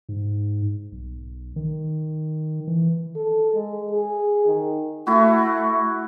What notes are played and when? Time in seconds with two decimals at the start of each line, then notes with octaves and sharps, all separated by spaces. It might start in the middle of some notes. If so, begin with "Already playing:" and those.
0.09 G#2
0.92 B1
1.56 D#3
2.67 E3
3.16 A4
3.54 G#3
3.92 G#4
4.47 D#3
5.07 A3 E4 F#4